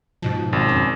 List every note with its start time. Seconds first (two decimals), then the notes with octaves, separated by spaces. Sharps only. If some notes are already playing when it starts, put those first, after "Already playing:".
0.22 G#2 B2 F3
0.53 G#1
0.69 F2 C#4